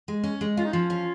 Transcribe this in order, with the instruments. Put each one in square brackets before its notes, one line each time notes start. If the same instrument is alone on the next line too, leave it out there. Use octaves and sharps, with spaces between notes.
[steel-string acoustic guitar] G#3
C#4
G#3
[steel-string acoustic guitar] C#4 [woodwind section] F4
[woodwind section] D#4
[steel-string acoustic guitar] F3 [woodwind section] F4
[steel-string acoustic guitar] C#4